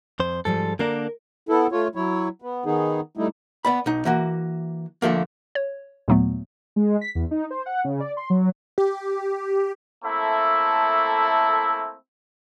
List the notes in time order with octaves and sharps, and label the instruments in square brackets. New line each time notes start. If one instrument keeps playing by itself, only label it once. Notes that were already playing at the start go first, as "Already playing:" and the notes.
[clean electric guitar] F2 C5
[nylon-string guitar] G#2 F3 G3 [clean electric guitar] A4
[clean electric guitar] D3 A#3 D4 [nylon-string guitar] A#4
[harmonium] B3 E4 A4
A3 F4 C#5
F#3 E4 C#5
B3
D#3 B3 D#4 G#4
G3 A3 D#4 E4
[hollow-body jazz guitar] B3 D5 B5
B1 D#4
E3 A#3 F#4
D3 F3 A3 A#3
[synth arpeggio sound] C#5
D#2 A#2 F#3 A3 B3
[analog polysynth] G#3
B6
E2
D#4
C5
F#5
C#3
D5
C6
F#3
[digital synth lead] G4
[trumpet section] A3 A#3 C4 E4 A4 E5